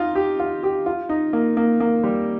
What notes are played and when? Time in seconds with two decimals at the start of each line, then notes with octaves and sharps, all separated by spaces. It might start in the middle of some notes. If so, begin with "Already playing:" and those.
Already playing: D#4 F4
0.15 G4
0.40 F4
0.63 G4
0.86 F4
1.09 D#4
1.33 A#3
1.57 A#3
1.80 A#3
2.04 G3